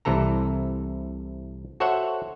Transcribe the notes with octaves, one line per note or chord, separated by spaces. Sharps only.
C2 C3 E3 A4 A#5
F#4 A4 C5 C#5 E5 F#5